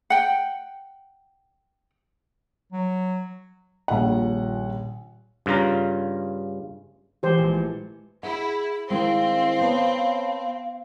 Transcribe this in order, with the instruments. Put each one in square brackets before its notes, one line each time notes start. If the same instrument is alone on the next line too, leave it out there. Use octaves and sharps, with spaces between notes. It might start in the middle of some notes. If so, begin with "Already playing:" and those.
[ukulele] F#5 G5
[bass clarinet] F#3
[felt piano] D#1 A#1 F#5
[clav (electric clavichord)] G2 C#3 F4 A#5
[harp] E3 G#3 [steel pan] G4 C5
[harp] A#1
A3
[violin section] E4 [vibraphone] G#4 [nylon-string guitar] F#5
[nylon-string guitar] D#3 G#3 [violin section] C4 [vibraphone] E4 A#4 [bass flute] F5
[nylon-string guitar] B3 [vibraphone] C#5 A5 B5